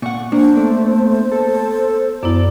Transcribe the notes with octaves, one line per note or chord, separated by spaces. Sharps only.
A#2 F#5 C#6
A#3 D4 C5
A3 B3
A4
F#2 B3 E4 D5